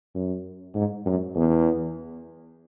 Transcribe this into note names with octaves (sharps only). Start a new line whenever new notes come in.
F#2
G#2
F#2
E2